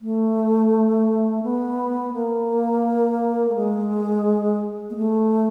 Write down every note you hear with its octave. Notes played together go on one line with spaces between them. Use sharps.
A3
B3
A#3
A3
G#3
A#3
A3